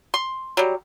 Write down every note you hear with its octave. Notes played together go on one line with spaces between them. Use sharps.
C6
F#3 G3